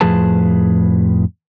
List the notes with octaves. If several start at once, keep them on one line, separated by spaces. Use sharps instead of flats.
F2 A2 F3 G#4 B4 A5